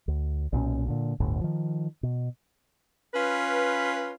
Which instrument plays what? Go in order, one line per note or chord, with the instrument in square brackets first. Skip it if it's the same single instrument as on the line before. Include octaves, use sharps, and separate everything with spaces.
[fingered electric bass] D2
B1 A#2 C#4
A#2 D3
G1 D2 A2
D#3 F3
B2
[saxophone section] C#4 F4 B4